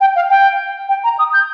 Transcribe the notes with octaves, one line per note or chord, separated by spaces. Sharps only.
G5
F5
G5
G5
A#5
D#6
G6